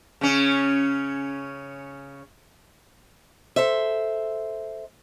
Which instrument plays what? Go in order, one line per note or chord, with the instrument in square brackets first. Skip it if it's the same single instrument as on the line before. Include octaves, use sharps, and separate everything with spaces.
[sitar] C#3 C#4
[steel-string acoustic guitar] A4 C5 E5